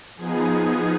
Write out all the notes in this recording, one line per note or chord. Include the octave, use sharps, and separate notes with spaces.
F3 B3 D#4 G#4
G#4